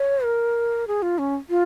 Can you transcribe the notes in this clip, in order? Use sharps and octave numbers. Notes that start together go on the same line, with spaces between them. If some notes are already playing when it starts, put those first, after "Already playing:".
Already playing: C#5
A#4
G#4
F4
C#4
F4